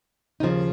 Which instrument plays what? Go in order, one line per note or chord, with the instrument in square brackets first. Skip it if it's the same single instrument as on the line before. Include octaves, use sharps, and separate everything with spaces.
[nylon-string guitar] D#2 C#3 F3 D#4